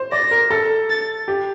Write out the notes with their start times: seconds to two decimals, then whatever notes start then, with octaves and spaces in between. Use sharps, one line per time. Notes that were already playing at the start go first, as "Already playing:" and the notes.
Already playing: C5
0.12 D5 A#6
0.31 A#4
0.50 A4
0.90 A6
1.28 G4